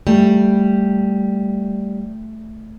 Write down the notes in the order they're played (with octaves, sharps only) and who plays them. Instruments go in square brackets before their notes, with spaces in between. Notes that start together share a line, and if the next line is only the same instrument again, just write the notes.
[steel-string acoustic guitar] G3 [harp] A3